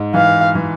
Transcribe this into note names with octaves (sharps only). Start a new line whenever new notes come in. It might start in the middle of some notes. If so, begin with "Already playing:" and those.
Already playing: G#2
E3 F5
E3